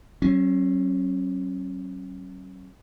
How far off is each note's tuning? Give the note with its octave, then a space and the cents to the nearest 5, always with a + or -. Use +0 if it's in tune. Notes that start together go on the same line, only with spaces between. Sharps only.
F#3 +35 C#4 -30